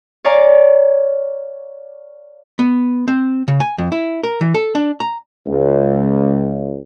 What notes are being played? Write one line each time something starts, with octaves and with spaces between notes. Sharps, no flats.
C#5 D5 F5 G#5 A#5 D6
B3
C4
C#3
G#5
F2
E4
A#4
E3
A4
D4
A#5
C#2